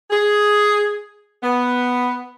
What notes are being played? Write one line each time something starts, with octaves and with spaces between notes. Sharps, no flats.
G#4
B3